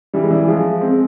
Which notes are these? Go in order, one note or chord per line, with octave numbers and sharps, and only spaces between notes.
E3 G3
G#3
E3 G3
F3 G#3
G#3 C4